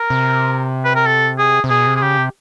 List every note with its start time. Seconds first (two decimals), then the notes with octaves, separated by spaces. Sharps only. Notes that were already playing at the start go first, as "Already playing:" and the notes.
Already playing: A#4
0.10 C3
0.85 B4
0.95 A#4
1.07 A4
1.38 G#4
1.64 C3
1.70 B2 G#4
1.87 C3
1.96 G#4
2.02 C#3 G4
2.18 C3